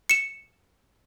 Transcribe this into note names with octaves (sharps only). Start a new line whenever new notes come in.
C#7 E7